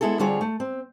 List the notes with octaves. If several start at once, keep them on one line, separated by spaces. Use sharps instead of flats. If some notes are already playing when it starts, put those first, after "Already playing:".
G#3 B3 E4 G#4 A4
D3 G3 C4 F4 G#4 C#5
A3
C4